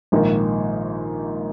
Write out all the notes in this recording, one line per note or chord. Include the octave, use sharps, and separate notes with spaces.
A#1 G#2 D#3 A#3 D#4